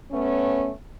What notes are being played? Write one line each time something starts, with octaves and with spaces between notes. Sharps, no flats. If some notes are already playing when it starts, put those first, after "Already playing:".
A3 B3 C#4